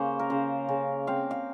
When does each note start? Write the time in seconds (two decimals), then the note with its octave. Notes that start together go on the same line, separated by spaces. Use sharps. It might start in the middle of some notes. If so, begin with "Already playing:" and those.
Already playing: C#3 A#3 C5
0.19 A#4
0.30 C#3 C5
0.69 C#3
1.07 C4 F5
1.31 F5